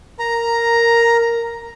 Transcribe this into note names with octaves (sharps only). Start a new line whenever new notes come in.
A#4 A#5